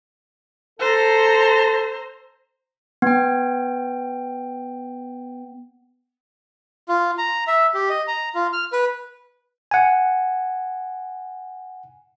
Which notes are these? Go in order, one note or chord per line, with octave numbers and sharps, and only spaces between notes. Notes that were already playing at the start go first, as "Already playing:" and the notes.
A4 C5 A#5
B3 G5
F4
A#5
E5
G4
D#5
A#5
F4
F6
B4
F#5 G#5